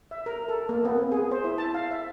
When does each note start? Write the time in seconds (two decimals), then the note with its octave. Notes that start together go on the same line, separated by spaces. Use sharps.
0.11 E5
0.26 A#4
0.48 A4
0.69 A#3
0.85 B3
0.98 C4
1.12 G#4
1.31 C5
1.44 E4
1.58 A5
1.74 F5
1.91 E5